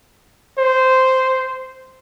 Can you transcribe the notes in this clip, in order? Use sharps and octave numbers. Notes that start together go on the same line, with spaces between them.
C5